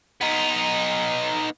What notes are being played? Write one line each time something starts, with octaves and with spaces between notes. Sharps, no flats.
B3 D#4